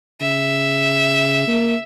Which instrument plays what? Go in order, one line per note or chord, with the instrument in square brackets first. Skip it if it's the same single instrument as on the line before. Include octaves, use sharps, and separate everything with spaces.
[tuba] C#3 [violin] E5
[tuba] A#3